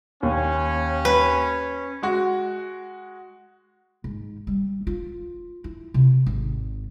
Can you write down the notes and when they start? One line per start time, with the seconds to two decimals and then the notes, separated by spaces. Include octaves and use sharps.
0.23 D#2 C#4
1.05 B4
2.03 G#3 F#4
4.04 G#2
4.47 G3
4.87 F4
5.64 E4
5.94 C3
6.26 G#1